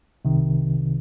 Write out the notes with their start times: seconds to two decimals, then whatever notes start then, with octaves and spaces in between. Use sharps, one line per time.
0.25 C2 C3 D#3